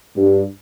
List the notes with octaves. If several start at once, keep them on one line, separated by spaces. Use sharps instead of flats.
G2